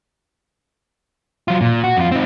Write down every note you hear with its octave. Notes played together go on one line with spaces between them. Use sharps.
F#3 F4
A#2
F#4
F2 F4
C4 D#4